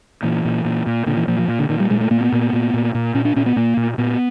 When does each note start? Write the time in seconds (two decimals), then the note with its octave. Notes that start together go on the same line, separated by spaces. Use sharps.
0.23 A#2 E3
0.45 A#2
0.65 A#2
0.86 A#2
1.06 A#2 D3
1.17 E3
1.27 A#2 F3
1.39 F3
1.48 A#2
1.59 D3
1.69 A#2 D#3
1.80 G3
1.90 A#2 G#3
2.01 A3
2.11 A#2 A#3
2.21 B3
2.32 A#2
2.53 A#2
2.73 A#2
2.94 A#2
3.14 A#2 C#4
3.25 D4
3.36 A#2 C#4
3.46 B3
3.56 A#2 A#3
3.77 A#2
3.98 A#2 B3